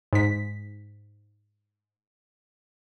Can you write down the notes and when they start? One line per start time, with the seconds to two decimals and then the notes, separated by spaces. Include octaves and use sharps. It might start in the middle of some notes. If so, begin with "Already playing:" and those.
0.13 G#2 B6